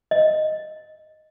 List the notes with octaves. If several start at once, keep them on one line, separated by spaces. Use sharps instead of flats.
D#5